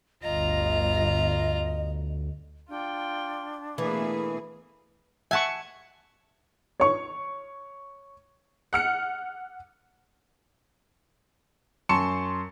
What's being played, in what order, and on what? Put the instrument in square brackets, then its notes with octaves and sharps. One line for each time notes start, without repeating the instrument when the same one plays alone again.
[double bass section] G1 G2 [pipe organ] D2 [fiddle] F4 A#5 [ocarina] D#5
[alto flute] D4 [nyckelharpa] F4 G5
[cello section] B2 A3 G#4 [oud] E3 [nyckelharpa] A#3
[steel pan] E5 F#5 C#6 [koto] G#5 A5
[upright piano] C#5 C#6
[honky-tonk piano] F#5 F6 C#7
[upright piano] F#2 A5 C6 C#6 C#7 E7